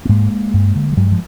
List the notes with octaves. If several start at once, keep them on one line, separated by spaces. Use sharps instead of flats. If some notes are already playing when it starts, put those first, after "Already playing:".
B3
G#2 G#3 A#3
G2
D3
G3
G2 F#3 G#3
F3